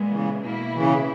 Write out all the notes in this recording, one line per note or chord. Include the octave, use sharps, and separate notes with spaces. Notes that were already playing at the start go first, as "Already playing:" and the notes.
Already playing: A#2 G#3 B3
C#3 E3
B2 A#3 E4
C#3 E3